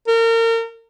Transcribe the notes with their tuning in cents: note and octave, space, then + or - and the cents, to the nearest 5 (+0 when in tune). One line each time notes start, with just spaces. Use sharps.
A#4 -35